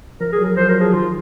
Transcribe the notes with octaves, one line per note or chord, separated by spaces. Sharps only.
F3 A#4
G#4
F#3
A#4
F3 C5
F#3 A#4
F3 G#4
D#3 F4